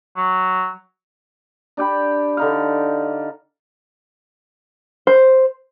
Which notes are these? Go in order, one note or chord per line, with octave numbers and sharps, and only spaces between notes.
F#3
D4 G4 G5 B5
D3 D#4 F5
C5